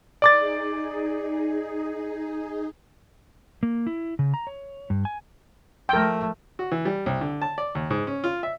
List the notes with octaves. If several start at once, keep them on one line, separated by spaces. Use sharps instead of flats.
D#4 G#4 D5 D6 A6
A#3
E4
C#3
A#5
C#5
G2
G#5
F3 A3 A#4 G5
F#4
E3
G3
C2
D3
A5
D5
D#2
G#2
C#4
F4
E5